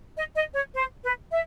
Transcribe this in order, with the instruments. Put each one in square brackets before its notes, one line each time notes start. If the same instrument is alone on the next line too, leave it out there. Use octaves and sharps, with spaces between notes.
[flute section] D#5
D#5
C#5
C5
B4
E5